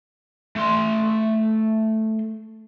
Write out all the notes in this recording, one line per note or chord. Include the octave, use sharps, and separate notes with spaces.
A3 C6